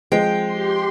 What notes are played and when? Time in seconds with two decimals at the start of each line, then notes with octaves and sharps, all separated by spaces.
0.12 F3 G#3 C4 G5
0.44 G4 C6